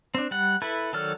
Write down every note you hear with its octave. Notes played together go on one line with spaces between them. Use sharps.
C4 D4
G3 F#5
E4 A4 B4
D#3 F#3 A4 D5 F6